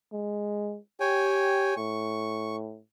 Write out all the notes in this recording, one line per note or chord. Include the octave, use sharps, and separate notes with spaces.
G#3
G4 C#5 G5 G#5
A2 C#6